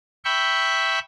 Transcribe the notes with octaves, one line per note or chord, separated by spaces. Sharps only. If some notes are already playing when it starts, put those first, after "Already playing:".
E5 G5 B5 C#6